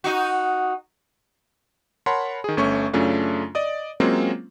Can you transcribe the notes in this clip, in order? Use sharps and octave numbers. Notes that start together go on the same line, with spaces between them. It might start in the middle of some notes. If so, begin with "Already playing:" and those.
D#4 F#4
A#4 C#5 F#5 A5 B5 C6
D#3 G#4
G1 A3 C#4 E5 C#6
F#2 C#3 A3 C#4 D4 F4
D5 D#5 D#6
F#3 G#3 A#3 C4 C#4 F4